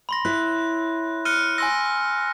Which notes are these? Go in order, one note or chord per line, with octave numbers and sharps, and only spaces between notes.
B5 C6 A#6
E4 C#5 E5 F#6
F6 F#6 C#7 D#7 G7
G#5 C6 E6 A#6